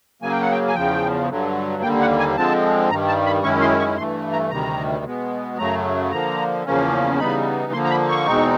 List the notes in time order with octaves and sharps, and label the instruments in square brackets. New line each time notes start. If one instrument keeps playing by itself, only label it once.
[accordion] C#3 F#3 A#3 G#5
G5
F#5
G5
G#5
E2 C#3 F3 G5
G2 D3 F#3
D#2 D3 G3 A#3 G5
F#5
G#5
D3 F3 G#3 C4 A5
G2 D#3 G3 A#5
A5
B5
F#2 D#3 G#3 C#4 E4 C#6
C6
C#6
G2 E3 A3 C6
A#5
D2 C3 D#3 G3 A#5
B2 G#3 B3
F#2 C#3 F#3 A3 A#5
D3 F3 A#3 A#5
E2 C#3 F3 A#3 C#4
C#3 E3 G3 B3 D#4 B5
D3 F3 A#3 C6
A#5
B5
C#6
E2 B2 G#3 C4 D#4